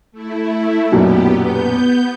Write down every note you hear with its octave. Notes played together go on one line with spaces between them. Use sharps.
A3 E4
B1 F#2 A#2 B3 G4
B3 G6